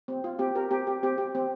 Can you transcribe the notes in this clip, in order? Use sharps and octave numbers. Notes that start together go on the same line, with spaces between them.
C4
F4
C4 G4
G4 A#4
C4 G4
G4
C4 G4
G4
C4